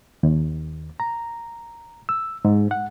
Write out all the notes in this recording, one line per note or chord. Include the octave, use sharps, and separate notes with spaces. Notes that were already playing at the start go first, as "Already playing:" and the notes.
D#2
A#5
E6
G#2
F#5